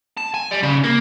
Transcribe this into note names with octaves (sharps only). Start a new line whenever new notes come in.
A5
G#5
G3
C#3
A#3